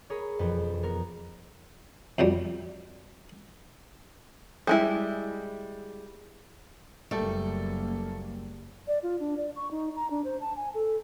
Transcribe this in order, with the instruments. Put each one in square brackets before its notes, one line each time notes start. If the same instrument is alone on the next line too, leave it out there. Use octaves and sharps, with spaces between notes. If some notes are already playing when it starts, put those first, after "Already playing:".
[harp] G#4 A#4 C#5 B5 D#6
E1 F2 B4
B3 A#4
[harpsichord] F2 B2 F#3 G3
[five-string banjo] G3 G#3 E4
[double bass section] F#1 A#3 [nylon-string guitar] G3 [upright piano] A3 A4
[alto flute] D5
F4
D4
D5
C#6
D#4
A#5
D4
C5
A5
G#5
A4